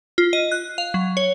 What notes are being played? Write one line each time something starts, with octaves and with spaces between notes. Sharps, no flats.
F4
D#5
F#6
F5
F#3
C#5